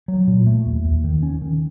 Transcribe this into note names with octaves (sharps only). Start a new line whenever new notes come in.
F#3
A#2
A3
D#2
D#2
D#3
C#4
D#3